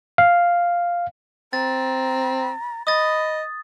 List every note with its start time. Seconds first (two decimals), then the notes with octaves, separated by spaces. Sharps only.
0.18 F5
1.53 C4 A#5 A6
2.87 D#5 B5 D#6 A6